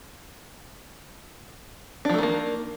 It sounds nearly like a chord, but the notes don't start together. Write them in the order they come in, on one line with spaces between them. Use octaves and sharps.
D4 F3 A3 D#3 A#3